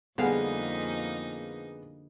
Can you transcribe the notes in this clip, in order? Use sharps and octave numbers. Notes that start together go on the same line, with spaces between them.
F2 D3 G3 A#3 B3 D#4 G#4 F5